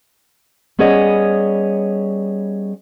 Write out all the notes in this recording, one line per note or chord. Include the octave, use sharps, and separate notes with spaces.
G3 B3 C#4 G#4 C#5 D#5